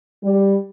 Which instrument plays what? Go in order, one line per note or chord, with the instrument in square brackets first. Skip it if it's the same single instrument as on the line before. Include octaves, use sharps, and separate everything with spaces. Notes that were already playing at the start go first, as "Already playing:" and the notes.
[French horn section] G3